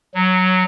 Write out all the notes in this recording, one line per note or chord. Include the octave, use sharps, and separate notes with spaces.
F#3